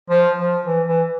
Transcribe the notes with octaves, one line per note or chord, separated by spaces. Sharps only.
F3
F3
E3
E3